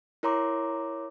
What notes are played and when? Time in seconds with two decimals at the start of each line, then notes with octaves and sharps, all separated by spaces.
0.23 E4 A#4 C#5 A#5 C6 D6